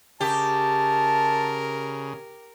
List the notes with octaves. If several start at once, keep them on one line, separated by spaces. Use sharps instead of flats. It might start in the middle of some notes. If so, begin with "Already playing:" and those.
C#3 G4 A#4 A5